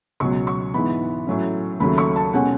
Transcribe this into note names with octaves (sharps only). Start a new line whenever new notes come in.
C#2 B2 F#3 C#6
C#6
G#2 E3 B3 B5
A2 F#3 C#4
D#2 C#3 F#3 A3 B5
C#6
A5
B2 G#3 C#4 F#5